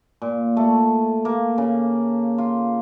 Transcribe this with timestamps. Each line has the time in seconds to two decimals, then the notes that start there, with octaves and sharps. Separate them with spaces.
0.22 A#2
0.57 A3
1.25 A#3
1.58 C#3
2.38 F4